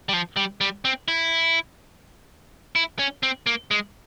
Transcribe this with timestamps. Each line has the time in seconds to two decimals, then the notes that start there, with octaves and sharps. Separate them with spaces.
0.09 G3
0.13 F3
0.36 G3
0.61 G3
0.85 C4
1.08 E4
2.76 E4
2.99 C#4
3.23 C4
3.46 A#3
3.71 G#3